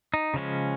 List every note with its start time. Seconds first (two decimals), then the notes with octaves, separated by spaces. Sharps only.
0.14 D#4
0.34 C#3 F3 G#3 C#4